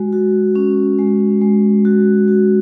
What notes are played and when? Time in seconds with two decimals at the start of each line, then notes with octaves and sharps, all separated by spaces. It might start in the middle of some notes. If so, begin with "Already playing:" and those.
Already playing: G#3 F#4
0.13 F#4
0.56 C#4
0.99 G#3
1.41 G#3
1.85 F#4
2.28 F#4